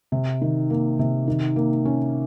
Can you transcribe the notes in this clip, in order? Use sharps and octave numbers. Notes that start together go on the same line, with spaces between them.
C3
D#3
A#3
C3
D#3
A#3
C#4